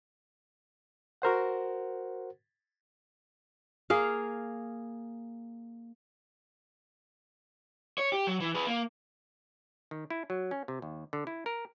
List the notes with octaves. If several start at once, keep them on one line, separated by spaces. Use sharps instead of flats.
F#4 A#4 C5 F#5
A#3 G#4 F5
C#5
G4
F#3
E3
G#4 B4
A#3
D#3
E4
F#3
C#4
C3
D#2
D3
E4
A#4